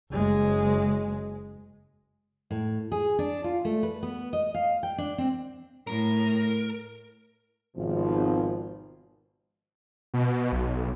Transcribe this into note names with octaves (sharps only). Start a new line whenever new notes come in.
F#1 G#3
A2
G#4
D4
F4
A3
B4
B3
D#5
F5
G5
D4
C4
A2 A#4
G#1 B2 F3
B2
B1